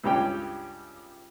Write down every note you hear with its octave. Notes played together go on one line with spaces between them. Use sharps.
C#2 G2 G3 G4 C#5 G5